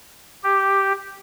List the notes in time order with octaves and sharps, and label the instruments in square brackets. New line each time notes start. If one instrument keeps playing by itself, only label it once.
[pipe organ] G4